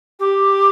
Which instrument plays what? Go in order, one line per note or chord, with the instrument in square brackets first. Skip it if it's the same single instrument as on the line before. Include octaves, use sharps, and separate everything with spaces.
[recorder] G4